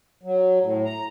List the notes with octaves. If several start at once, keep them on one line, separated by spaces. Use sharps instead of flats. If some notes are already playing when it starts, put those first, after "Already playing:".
F#3
A2
A#5